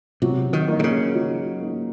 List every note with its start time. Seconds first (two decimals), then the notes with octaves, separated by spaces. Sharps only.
0.22 C3 F#3
0.53 D#3
0.68 A#3 D#4
0.79 C3
0.84 C#3
1.15 F#3
1.61 A#3 D#4